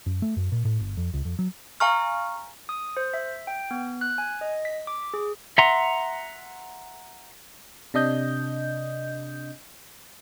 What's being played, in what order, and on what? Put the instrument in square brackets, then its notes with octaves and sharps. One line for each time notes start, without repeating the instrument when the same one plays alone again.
[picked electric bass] F#2
A3
F#2
A#2
A2
G1
F2
C#2
F2
F#3
[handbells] F5 G#5 A#5 C#6 F6
D#6
C5
E5
G5
B3
F#6
G#5
D#5
B6
D6
G#4
[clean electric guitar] E5 F#5 A#5 C6
[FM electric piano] C3 D4 D#5 G6